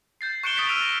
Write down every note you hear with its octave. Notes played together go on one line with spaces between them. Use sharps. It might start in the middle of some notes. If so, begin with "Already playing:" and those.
G6 A6 C7
C#6 F#6 C#7 D7 E7 G7
D#6 A6 B6 D7
E6 F6 D7 D#7 F7
A#6